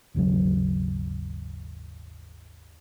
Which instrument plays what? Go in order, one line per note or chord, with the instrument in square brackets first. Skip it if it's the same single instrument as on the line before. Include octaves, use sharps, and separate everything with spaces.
[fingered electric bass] G#1 D#2 C#3 F#3